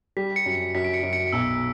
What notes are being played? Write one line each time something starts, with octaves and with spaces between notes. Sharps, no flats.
G3 B6
C#7
F#2
C#7
F#2 B6
D7
C#7
F#2
C#7
B1 E6